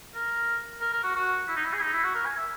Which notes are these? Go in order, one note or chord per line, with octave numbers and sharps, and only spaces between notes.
A#4
A#4
A#4
F#4
F#4
E4
D#4
E4
G#4
D#4
E4
F#4
A#4
G#5
E5